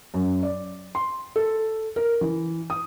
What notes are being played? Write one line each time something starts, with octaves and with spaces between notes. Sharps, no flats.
F#2
D5
C6
A4
A#4
E3
D#6